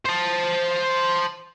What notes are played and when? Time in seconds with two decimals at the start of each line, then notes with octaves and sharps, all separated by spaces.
0.05 C5 A5